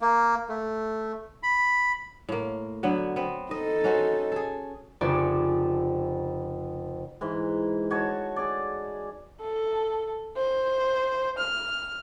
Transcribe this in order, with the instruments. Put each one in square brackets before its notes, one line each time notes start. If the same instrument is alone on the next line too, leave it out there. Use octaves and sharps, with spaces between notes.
[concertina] A#3
A3
B5
[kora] A2 A#3
D3 F#3 B3
B3 C4
[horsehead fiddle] D#4 A4 [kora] D#5
[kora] C#4 F#4 C5
G#4 A4
[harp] F1 F2 C#3 D4 D5 C#6
[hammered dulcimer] G#2 E3
F#4 C#5 D#5 A5
G#4 D5
[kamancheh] A4
C5
F6